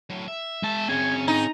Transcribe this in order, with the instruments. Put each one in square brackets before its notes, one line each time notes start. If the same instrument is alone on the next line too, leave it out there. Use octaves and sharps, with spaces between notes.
[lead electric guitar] A2 F#3
E5
[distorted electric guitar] G#3 A5
[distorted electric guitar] C4 G#4 [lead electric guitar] C#4 G#5 [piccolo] G#6
[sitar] D#4 [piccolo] A#5